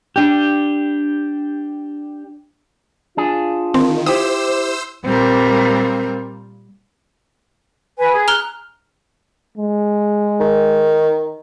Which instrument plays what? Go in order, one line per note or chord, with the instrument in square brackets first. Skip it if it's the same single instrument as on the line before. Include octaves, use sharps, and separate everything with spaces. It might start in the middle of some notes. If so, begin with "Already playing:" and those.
[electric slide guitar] D4 G4
[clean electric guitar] D4 G#4 [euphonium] F4
[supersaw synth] D#3 [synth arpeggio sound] C4
[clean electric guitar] E4 G4 [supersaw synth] C5 E6 [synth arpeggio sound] D#6
[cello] A#2 G3 [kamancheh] C4 A#4
[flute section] B4 G#5
G#4
[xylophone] A#5 F6 G7 [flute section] F#6
[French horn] G#3
[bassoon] D#3